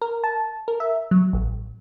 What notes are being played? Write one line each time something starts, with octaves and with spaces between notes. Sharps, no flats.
A#4
A5
A#4
E5
F#3
A1